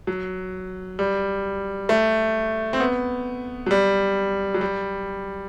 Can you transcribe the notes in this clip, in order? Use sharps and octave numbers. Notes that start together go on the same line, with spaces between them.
F#3
G3
A3
C4
B3
F#3
G3
F#3
G3